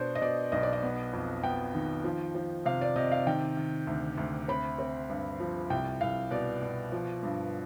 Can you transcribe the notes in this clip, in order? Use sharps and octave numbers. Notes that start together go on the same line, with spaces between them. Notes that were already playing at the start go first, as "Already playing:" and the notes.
Already playing: B2 D4 C5 D5
D#5
B2 D5
B1 D#5
D5
D#5
B3
F2
B3 G5
D#3
F3
F3
C3 F5
D5
C3 D#5
F5
D#3 G5
D#3
D2
D2
C4 B5
C4
G2
F3
C2 G5
C2 F5
B2 D5
B2
F3
G2